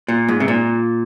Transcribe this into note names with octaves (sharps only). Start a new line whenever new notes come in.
A#2
G#2
C3
A#2